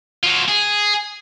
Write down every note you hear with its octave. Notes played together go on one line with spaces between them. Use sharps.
F#3 F4
G#4